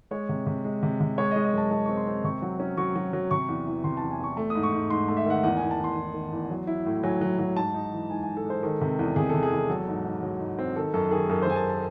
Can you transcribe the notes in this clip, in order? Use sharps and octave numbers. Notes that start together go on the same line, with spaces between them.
G#3 C#5
C3
C3
G#3
C3
C3
G#3 C#5
D#5
G#3
D#5
F#2 A5
G#3 A5
C4 C#6
C6
C4
C3 C#6
F#3
C#4
F#3 C#6
F#3
F#3
C3 C#6
E2
E3
C3 C6
A5
E2
G#5
E2 C#6
A3
D#6
G#2
C#6
G#2
G#2 C6
A3
E5
D#3 F#5
E2 F#5
G#5
E2
A5
E2 C6
E2
D#3
E2
F#3
E4
A2
F#3 G#5
F#3
F#3
G#2 A5
D#4
E3
G#2 G#5
G#5
G#2
A4
G#3 C5
D#3 A4
C3
E2
C3 G#4
A4
C3
G#4
E2 A4
F#3 A4
G#2
D#4
F#3
G#2
C4
D#3 A4
F#2 A4
D#3 G#4
F#2 A4
C5
F#2 G#5
A5
A5